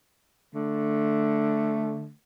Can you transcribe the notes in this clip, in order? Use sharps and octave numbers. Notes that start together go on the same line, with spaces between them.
D3 A3